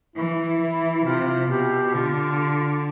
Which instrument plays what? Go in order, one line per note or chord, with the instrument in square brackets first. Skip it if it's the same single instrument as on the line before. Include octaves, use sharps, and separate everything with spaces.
[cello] E3 [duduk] E4
[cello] E3
[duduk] E4
[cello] C3 [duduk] F4
[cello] B2 [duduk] G4
[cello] D3 [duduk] F4